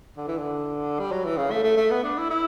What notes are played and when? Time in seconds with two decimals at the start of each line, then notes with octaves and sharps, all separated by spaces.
0.17 D3
0.28 E3
0.38 D3
0.99 G3
1.12 F#3
1.25 E3
1.37 C#3
1.51 A3
1.64 A3
1.77 A3
1.91 B3
2.04 D4
2.18 E4
2.31 E4